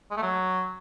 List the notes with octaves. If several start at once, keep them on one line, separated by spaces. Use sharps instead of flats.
G#3
A3
F#3